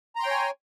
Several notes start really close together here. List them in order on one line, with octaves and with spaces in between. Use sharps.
A#5 C6 G5 C#5 G#5